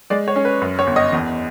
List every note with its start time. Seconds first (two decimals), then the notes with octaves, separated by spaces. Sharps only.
0.10 G#3 D5
0.28 C#5
0.36 C#4
0.45 B4
0.61 F#2
0.79 C#5
0.87 G1
0.96 D#5
1.13 E2